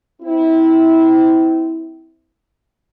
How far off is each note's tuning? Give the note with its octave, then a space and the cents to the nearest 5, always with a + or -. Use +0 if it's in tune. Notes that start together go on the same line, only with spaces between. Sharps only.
C4 -25 E4 -20